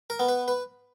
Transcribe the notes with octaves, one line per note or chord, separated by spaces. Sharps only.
A#4
B3
B4
B4